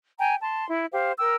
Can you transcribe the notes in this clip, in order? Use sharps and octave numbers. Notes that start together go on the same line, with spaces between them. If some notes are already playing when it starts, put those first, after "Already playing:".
G5 G#5 A#5
A5 C6
E4
G4 C5 F5
A#4 G5 E6